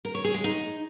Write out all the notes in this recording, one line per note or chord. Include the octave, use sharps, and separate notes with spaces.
A#4
C#5
G#4
G#3
D#4